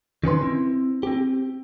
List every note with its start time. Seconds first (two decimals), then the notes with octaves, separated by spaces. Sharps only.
0.24 D#3 C#4 B4 C6
0.42 C4 E4
1.03 C4 G4